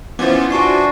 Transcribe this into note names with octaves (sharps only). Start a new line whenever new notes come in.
E3 B3 C#4 F4 C5 D6 A6
D4 F4 F#4 G#5 C#6 C7